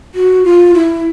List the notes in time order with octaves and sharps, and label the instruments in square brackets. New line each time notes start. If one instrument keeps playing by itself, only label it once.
[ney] F#4
F4
E4